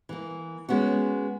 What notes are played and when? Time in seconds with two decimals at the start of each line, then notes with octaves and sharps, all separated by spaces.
0.09 E3 A#3
0.69 G#3 B3 C#4 F#4